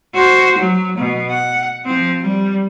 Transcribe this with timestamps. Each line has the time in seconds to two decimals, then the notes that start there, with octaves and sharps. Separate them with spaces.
0.14 F#4 C5
0.58 F#3
0.97 B2
1.30 F#5
1.85 F3 C4
2.20 G3